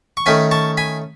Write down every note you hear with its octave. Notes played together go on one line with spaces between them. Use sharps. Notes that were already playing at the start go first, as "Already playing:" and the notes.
C#6
D#3 A3 C#4 G#5 B5
A5 C#6
G#5 B5